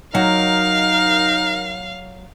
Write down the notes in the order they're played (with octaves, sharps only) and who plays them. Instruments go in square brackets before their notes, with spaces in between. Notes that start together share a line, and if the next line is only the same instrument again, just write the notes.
[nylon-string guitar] F#3 F#5 [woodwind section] D#4 A#4 [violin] F5